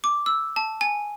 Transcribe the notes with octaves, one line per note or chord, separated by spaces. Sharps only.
D6
E6
A5
G#5